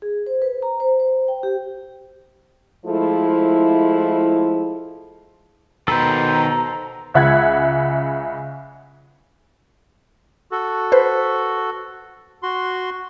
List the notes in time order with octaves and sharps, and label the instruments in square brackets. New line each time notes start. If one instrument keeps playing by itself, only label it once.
[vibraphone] G#4
C5
B4
A#5
C5
C5
G5
G4
[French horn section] F3 G#3 A3 E4
[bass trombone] B2 [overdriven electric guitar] D#3 B4 [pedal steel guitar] A4 C5 [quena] A#5
[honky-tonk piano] C#2 C#3 E5 F#5 F#6 G#6
[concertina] F#4 A4
[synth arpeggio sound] B4 C5
[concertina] F#4 C6